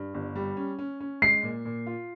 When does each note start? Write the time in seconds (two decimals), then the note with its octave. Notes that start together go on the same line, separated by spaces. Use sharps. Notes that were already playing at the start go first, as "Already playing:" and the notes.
Already playing: G2
0.14 G1
0.36 G3
0.57 C#4
0.79 C#4
1.00 C#4
1.22 G#3 C7
1.43 A#2
1.65 A#2
1.87 F4